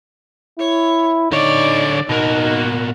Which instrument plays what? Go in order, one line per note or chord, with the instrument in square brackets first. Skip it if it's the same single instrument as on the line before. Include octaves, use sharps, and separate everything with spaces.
[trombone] E4 [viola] C#5
[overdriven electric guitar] D3 C#5 [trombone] D#4 [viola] D5
[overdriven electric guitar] B2 A#3 [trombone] D#4 [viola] F#4